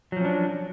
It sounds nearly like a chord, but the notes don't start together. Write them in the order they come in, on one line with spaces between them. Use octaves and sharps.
F#3 F3 C#4 D4